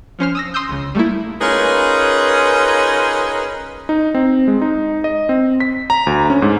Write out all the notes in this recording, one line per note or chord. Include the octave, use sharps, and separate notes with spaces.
F3 C#4 C5 F6
D#6 E6 A#6
C6 D#6 E6 G6
C#2 C#3
G3 A3 A#3 E4
C#4 D#4 F4 G#4 A#4 B4
D#4
C4
G#3
D#4
D#5
C4
B6
A#5
D2
C#4
G#2